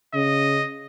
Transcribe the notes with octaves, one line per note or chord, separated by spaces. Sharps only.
C#3 D#5